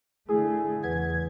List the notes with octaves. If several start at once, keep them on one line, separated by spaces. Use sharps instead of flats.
D3 A3 E4 G#4
E2 C#3 B4 F#5 G#6